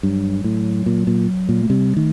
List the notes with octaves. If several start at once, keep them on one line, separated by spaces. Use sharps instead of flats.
G2 F#3
A2
A#2
A#2
A#2
A3
C3 G3
D#3 A3